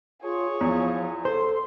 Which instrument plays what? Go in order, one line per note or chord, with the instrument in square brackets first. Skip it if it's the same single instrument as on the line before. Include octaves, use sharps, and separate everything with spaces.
[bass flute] F4 [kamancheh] G#4 C#5
[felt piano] E2 [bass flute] F3
[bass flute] A4 [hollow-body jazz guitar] C5 [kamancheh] C6